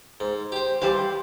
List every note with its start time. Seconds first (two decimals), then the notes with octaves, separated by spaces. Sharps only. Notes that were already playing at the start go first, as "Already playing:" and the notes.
0.20 G#2
0.52 G4 C5
0.82 E3 G3 G4 C5 F5